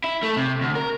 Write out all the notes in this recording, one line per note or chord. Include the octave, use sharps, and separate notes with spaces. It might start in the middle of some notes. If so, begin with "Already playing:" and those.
E4
A3
C3
D2
A#4